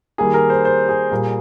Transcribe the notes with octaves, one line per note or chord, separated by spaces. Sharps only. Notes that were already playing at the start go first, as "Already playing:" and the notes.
D#3 G3 A#3 G#4
A#4
C5
C5
G#4
A#2 G3 A#3